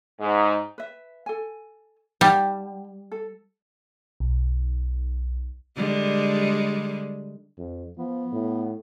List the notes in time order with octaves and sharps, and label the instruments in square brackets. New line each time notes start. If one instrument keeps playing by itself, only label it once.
[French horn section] G#2
[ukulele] B4 E5
A4 G#5
[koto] G3 [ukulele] F#5 G5 A5
[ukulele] A4
[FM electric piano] B1
[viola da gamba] D3 G3 G#3
[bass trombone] F2
[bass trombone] F3 [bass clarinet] B3
[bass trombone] A2